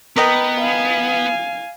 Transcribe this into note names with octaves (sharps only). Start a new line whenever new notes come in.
B3 A#4 B4 D#5 G5
F5 G#5